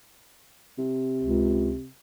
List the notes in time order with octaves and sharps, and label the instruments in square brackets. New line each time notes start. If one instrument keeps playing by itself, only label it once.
[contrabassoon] C3
[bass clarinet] C#2